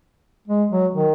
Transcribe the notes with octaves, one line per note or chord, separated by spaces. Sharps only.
G#3
F#3
D#3